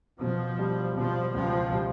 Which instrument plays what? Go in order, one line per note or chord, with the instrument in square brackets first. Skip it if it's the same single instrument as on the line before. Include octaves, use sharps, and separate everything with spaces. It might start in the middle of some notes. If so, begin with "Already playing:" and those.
[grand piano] B2 [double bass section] F3
[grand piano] G3
[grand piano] B2 [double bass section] F3
[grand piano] C#2 [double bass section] F3
[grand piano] G3